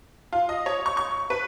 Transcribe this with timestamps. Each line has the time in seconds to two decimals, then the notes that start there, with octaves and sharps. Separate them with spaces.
0.33 F4
0.49 D#5
0.66 C#5
0.86 C#6
0.97 C#6
1.30 B4